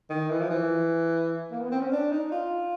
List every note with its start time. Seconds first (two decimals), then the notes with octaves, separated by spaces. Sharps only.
0.10 D#3
0.30 E3
0.41 F3
0.50 E3
1.51 A#3
1.61 B3
1.71 C4
1.81 C#4
1.92 D4
2.11 D#4
2.32 F4